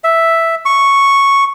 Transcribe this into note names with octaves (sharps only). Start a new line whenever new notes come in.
E5
C#6